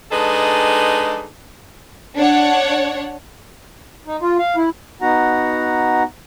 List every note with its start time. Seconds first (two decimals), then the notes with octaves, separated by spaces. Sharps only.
0.12 G#3 D4 D#4 G#4 A4 B4
2.17 D4 C#5 F#5
4.07 D#4
4.21 F4
4.39 F5
4.57 E4
5.02 B3 D#4 F#4 F#5 A#5